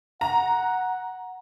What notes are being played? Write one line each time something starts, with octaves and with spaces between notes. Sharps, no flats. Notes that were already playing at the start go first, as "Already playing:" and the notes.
F#5 A#5